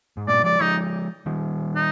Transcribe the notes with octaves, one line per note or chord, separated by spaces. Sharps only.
G#2
G2 A#2 D5
F3 G#3 D5
F3 G#3 D#4
D#3 G3
D#4